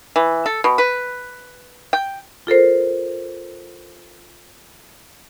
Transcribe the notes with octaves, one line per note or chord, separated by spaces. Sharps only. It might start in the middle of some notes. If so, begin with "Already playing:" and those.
E3
A4
B2
B4
G5
F4 A4 A#4 C5